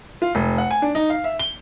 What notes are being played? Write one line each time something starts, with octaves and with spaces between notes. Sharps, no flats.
F4
F1
F#5
G#5
D4
D#4
F5
E5
G7